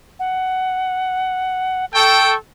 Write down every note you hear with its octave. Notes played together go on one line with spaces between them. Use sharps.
F#5
A4 G5 C#6